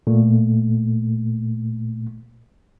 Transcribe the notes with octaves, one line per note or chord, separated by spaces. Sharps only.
A#2 A3